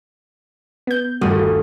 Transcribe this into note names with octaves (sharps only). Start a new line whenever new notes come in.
B3 G6
G1 D#2 G3 A3 F#4 D#6